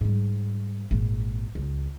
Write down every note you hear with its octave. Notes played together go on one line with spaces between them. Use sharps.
G#2 G3
G#1 A#2
C#2